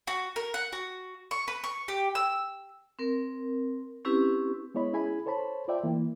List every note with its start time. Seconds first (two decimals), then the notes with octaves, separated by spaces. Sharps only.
0.07 F#4
0.36 A#4
0.54 F#5
0.72 F#4
1.31 C#6
1.48 B4
1.64 C#6
1.88 G4
2.15 E6
2.99 C4 A#4
4.05 C4 C#4 E4 G4 B4
4.75 G#3 B3 E4 C#5 D#5 B5
4.93 C#4 E4 G#4 G#5 B5
5.26 A4 C5 C#5 A5 B5
5.68 F4 C5 D5 E5 G5
5.83 E3 A#3 E4